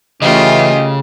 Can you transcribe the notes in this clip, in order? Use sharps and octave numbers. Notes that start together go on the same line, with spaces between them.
C#3 E3 A3 C#4 F4 G4 D#5